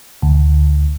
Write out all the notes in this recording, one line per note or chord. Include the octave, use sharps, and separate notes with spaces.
D2